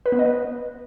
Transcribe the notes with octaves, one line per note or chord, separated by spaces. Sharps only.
B4
B3
D#5
B4